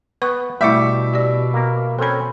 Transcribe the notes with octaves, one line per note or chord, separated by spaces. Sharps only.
B3 B4 C#6
B2 G3 A3 E4 E5 D6
G4 D5
A#3 A#4
C4 C#4 A4 B5